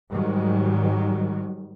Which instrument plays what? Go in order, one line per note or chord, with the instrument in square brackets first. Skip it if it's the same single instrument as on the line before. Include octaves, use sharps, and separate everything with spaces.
[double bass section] G#2 D#3 F#3 G3